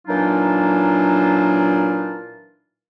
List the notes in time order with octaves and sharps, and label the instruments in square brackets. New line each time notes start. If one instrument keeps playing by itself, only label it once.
[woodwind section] A#2 E3 F#3 D4 D#4 F4